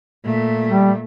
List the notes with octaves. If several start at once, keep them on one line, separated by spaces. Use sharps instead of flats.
A#2 A3
G3